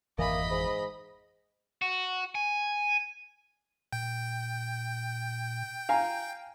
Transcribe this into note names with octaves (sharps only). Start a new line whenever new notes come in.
G#1 F2 E3 A#3 D#5 B5
G#2
F#4
G#5
A#2 G5
F5 G#5 A#5